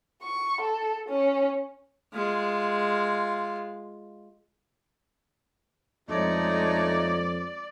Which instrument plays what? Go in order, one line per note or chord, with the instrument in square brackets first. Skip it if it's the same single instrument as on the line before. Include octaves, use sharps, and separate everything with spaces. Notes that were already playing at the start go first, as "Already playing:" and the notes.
[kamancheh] C#6
A4
C#4
[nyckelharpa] G#3 F4
[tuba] F2 [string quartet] G#3 C#5 A#5 [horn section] A3 D4 D#4 [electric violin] D5